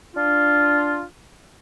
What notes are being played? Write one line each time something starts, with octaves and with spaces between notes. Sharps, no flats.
D4 F4